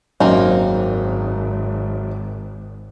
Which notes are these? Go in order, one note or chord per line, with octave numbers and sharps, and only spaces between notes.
G#1 F#2 A#3 C4 D#4